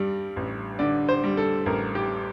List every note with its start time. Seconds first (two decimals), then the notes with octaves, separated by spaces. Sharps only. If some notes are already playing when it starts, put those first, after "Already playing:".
Already playing: G2 G3
0.36 A1
0.79 D3 D5
1.09 C5
1.24 G3
1.37 A4
1.66 A1 A#4
1.95 G4